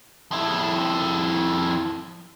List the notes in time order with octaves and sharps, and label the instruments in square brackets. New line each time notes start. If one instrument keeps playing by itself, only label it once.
[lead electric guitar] F2 E4